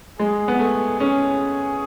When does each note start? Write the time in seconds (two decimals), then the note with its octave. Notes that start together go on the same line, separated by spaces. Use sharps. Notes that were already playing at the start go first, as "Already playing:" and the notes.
0.19 G#3 G#4
0.48 B3
0.59 A3 G#4
1.00 C#4 G#4